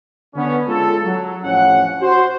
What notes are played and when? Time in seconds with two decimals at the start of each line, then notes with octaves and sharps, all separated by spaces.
0.36 D3 B3 C#4
0.67 G#3 C#4 F4 A4
1.05 F#3
1.44 A1 F2 C#4 F#5
2.02 F#4 C5